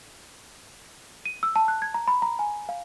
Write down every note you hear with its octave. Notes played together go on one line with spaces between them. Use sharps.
D#7
E6
A5
F#6
G#6
A#5
B5
A#5
G#5
F5